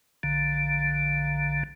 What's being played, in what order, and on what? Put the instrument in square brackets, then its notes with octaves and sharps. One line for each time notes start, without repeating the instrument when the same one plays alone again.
[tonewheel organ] A#1 D3